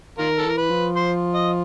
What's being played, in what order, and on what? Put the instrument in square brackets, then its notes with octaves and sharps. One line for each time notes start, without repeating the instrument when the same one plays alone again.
[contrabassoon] D#3 [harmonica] F4 A#4
[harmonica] A4
[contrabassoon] E3 [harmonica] A#4
[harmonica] B4
[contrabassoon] F3
[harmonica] C5
D#5